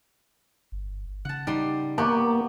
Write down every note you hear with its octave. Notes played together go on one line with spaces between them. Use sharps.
G1
C#3 F#5 A5
G3 D#4 C6
A#3 B3 G4 A#5 C#6 D6